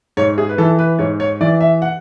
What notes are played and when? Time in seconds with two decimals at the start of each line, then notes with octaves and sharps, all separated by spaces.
0.17 G#2 C#5
0.38 G#4
0.49 B4
0.58 E3 A4
0.79 B4
0.99 G#2 C#5
1.20 C#5
1.41 E3 D5
1.61 E5
1.82 F#5